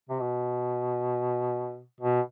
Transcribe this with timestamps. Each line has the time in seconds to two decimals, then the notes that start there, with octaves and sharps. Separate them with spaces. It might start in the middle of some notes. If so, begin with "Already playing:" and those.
0.09 C3
0.20 B2
2.00 B2